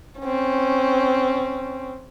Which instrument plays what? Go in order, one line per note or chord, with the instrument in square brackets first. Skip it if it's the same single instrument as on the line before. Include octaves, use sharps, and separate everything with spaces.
[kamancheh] C4 C#4